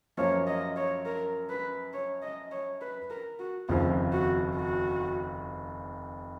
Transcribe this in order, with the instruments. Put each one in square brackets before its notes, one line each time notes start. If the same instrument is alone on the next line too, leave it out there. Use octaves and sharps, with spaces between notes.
[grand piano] F#2 F3 A#3 F4 [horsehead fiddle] C#5
[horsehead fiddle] D#5
C#5
A#4
B4
C#5
D#5
C#5
B4
A#4
F#4
[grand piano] F1 D#2 C#3 F3 [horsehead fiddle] F4
[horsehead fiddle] F#4
F#4